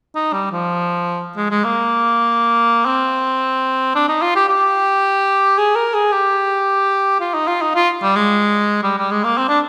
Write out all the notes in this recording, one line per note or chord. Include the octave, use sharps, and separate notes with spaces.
D#4
G3
F3
G#3
G#3
A#3
C4
D4
D#4
F4
G4
G4
G#4
A#4
G#4
G4
F4
D#4
F4
D#4
F4
G3
G#3
G3
G3
G#3
A#3
C4
D4